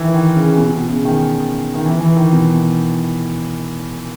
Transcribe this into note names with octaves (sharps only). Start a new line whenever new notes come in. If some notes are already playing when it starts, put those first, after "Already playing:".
Already playing: D#3 E3
D#3
C#3
B2
B2
C#3
D#3
D#3
E3
E3
D#3
B2